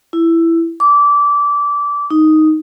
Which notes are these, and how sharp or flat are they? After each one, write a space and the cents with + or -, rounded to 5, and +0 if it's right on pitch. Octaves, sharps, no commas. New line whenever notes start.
E4 +10
D6 -20
D#4 +5